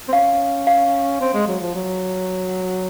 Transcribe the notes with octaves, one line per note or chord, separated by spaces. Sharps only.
C4
C#4 F5
F5
C4
G#3
F#3
F3
F#3